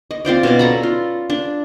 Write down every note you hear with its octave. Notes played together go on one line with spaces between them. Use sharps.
D#5
C4 F4 C5 D5
B2 C#4 D5
A4 A#5 B5
F4
D4